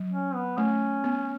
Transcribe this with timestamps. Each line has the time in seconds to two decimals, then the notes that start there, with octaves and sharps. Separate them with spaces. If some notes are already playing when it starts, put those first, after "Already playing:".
Already playing: F#3
0.12 C#4
0.35 B3
0.58 A3 C#4
1.04 B3